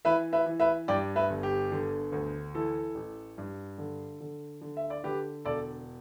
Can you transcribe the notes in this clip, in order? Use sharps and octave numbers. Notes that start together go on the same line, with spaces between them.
E3 B4 E5
B4 E5
E3
B4 E5
G2 D5 G5
B4 E5
G1
G4
D3
D2
E3 A4
A1
G2
D3
D3
D3
E5
D5
D3 G4 B4
E1 A4 D5